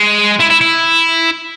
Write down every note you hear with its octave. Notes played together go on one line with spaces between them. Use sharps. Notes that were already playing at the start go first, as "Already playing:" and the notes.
Already playing: G#3
E4
E4
E4